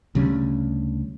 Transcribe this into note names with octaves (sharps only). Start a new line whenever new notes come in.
D2 C#3 G3 C#4